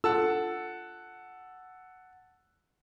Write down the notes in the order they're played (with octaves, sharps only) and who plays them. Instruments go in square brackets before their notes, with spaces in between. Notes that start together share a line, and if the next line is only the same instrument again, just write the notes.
[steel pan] F4 A4 [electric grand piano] F#5 A5 E6